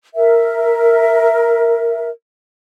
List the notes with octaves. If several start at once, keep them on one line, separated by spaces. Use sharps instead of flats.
A#4 E5